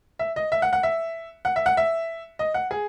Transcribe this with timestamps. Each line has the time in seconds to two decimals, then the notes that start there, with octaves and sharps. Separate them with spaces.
0.19 E5
0.36 D#5
0.52 E5
0.62 F#5
0.73 F#5
0.83 E5
1.45 F#5
1.56 E5
1.66 F#5
1.77 E5
2.39 D#5
2.54 F#5
2.71 G#4